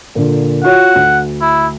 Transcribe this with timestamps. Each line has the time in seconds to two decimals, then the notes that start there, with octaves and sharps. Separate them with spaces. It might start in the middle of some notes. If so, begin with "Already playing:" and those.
0.15 A#2 D3
0.64 F4 F#4 C#5 F#5
0.95 D2
1.41 E4